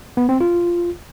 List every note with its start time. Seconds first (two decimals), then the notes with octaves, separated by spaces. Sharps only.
0.17 B3
0.29 C4
0.41 F4